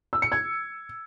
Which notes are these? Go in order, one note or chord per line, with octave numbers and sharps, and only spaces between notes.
E6
C#7
G#6